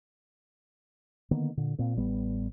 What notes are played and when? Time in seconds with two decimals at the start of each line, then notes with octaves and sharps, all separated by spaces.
1.31 D3 D#3 A#3 B3
1.57 A#2 D3
1.78 A#2 A#3 C4
1.96 A1 G3 B3